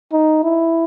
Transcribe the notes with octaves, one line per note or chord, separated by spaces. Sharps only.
D#4
E4